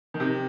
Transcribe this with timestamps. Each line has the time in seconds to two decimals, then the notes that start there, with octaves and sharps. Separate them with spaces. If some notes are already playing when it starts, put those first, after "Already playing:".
0.14 D#3
0.20 C3